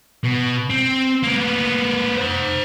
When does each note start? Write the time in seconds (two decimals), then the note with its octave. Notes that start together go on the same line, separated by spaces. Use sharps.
0.24 B2
0.70 C4
1.24 A#3 B3
2.17 C5 F#5